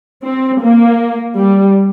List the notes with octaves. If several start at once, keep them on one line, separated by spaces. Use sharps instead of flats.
C4
A#3
G3